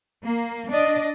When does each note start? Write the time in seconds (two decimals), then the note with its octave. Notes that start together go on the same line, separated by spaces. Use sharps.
0.24 A#3
0.70 D4 D5 D#5